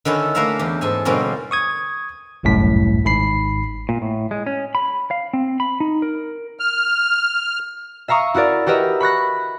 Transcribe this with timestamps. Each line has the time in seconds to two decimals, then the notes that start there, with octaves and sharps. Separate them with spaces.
0.05 D3 D#3 C#4 E4 A4
0.35 A3 A#3 A#4 B4 E5 F5
0.59 E2 G4
0.81 G#2 A4 G#5
1.05 B2 D3 G3 A#3 C4 C#4
1.51 C#6 D#6 G#6
2.43 G1 C2 F#2 A2 B6
3.04 G#1 G#2 B5 C7
3.89 A#2
4.02 A2
4.31 G#3
4.46 C#4
4.75 B5
5.11 F5
5.33 C4
5.60 B5
5.80 D#4
6.02 A#4
6.60 F6
8.08 E5 F5 A#5 C#6 D#6
8.34 E4 F#4 A#4 D5
8.66 F#4 G4 A#4 B4 D#5 E5
9.00 B5 C#6 F#6 A#6